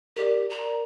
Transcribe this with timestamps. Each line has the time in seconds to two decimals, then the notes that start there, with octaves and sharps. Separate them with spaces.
0.16 G4 A#4 D5
0.50 A#5